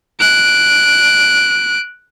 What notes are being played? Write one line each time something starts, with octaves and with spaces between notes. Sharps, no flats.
F#6 D7